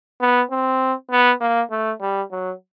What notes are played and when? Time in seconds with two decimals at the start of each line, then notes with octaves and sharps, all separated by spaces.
0.21 B3
0.51 C4
1.11 B3
1.40 A#3
1.71 A3
2.01 G3
2.31 F#3